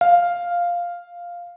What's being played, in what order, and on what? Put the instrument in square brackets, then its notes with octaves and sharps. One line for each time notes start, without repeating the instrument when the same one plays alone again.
[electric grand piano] F5